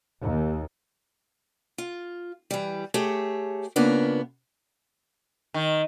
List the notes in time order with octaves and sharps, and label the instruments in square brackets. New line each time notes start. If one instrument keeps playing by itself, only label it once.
[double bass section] D#2
[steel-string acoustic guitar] F4
E3 G3
A3 G4 G#4 C#5 E5
C#3 F3 A#3 B3 D4
[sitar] D#3